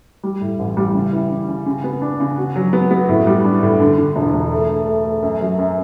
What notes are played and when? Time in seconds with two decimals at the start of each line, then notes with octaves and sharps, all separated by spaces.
0.23 G3
0.41 A2
0.59 A1
0.77 G3
0.95 C#3
1.12 E3
1.30 C#3
1.48 C#3
1.66 C#3
1.84 B3
2.02 D4
2.20 C#3
2.38 F#4
2.56 F#3
2.73 B3
2.91 B3
3.09 A2
3.27 G3
3.44 D4
3.63 A2
3.80 D3
3.98 D3
4.16 E1
4.34 E1
4.51 A3
4.69 A3
4.87 A3
5.05 A3
5.23 F#2
5.41 F#3
5.59 F#2